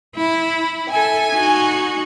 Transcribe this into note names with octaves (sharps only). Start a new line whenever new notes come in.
E4
A4 E5 G#5
D#4 F#4